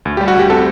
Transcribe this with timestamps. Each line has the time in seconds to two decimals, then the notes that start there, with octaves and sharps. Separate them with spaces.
0.05 D2
0.17 G3 G4
0.28 F#4
0.36 D2 G4
0.50 C4 F#4 A4